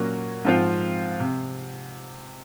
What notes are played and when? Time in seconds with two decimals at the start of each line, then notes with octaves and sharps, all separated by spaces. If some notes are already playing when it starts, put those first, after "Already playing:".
Already playing: A#2 F#3 A#3 C#4
0.45 G#2 F3 C4 F4
1.20 C3